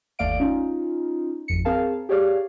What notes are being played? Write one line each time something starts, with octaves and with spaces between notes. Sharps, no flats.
G1 D#2 A3 D5 F5 D7
C#4 D#4 F4
G#1 F2 C#7
C4 G#4 A#4 F5 A5
G4 G#4 C#5 D5 F5